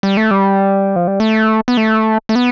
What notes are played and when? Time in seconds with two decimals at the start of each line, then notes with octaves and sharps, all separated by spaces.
0.03 G3
0.17 A3
0.31 G3
0.96 F3
1.08 G3
1.20 A3
1.68 B3
1.77 A3
2.29 A3
2.35 B3